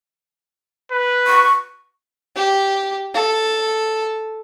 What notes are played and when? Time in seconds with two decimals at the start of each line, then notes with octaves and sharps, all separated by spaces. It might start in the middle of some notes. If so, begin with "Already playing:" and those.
0.92 B4
1.27 C#6
2.36 G4
3.14 A4